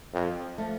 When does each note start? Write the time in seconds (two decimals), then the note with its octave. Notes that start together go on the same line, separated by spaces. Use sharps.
0.14 F2
0.58 F3 A3